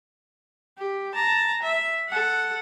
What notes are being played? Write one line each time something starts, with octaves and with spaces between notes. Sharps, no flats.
G4
A5 A#5
E5
A4 F#5